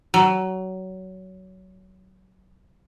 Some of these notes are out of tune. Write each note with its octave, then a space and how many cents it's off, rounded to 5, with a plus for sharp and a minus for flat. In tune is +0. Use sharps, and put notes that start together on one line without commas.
F#3 +20